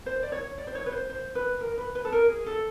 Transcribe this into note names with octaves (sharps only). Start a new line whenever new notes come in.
C5
D5
C#5
D5
C5
C#5
B4
C5
C5
B4
A#4
B4
B4
A4
A#4
G#4
A4